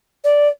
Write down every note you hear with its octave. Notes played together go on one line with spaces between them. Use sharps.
D5